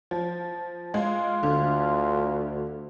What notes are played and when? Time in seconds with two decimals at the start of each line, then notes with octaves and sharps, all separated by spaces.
0.11 F3
0.94 G#3 F4
1.43 D2 D3